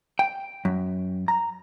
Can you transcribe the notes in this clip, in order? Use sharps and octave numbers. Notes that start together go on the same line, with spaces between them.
G5
F#2
A#5